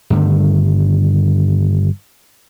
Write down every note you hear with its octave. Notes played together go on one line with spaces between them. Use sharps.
G2 D3 D#3 A3